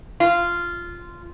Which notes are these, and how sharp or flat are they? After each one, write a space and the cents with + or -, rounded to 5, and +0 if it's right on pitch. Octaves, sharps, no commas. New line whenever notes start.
F4 -10